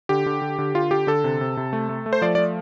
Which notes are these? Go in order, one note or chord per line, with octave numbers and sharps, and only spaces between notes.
D3 G4
D3
D3
D3
D3 F4
D3 G4
D3 A4
C3
C3
C3
A3
A3
A3
C5
F3 D5
D5
A3